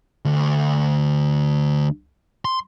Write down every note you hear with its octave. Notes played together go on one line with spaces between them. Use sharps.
D2
C6